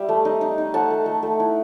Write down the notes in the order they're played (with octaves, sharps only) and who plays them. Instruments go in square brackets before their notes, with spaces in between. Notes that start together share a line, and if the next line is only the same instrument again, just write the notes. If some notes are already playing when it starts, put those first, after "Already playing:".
Already playing: [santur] G3 E5
A3
D#4
D#4
D#4
A3 F#5 A5
A3
A3
A3
E4